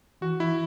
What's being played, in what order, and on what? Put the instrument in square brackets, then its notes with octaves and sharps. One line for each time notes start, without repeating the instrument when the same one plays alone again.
[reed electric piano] E3 [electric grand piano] F#4
[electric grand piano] E4